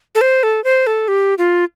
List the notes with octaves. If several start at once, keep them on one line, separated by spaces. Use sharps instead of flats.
A4
C5
A4
C5
A4
G4
F4